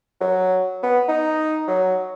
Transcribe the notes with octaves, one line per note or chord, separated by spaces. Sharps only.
F#3
B3
D#4
F#3